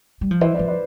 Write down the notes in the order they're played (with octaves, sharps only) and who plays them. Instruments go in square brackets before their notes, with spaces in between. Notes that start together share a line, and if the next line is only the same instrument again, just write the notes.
[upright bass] G3
F3
[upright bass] E3 [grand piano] C5 E5
[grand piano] B4 D5
[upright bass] F3
[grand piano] B4 D5